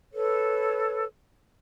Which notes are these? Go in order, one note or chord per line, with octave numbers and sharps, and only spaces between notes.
A4 B4 C#5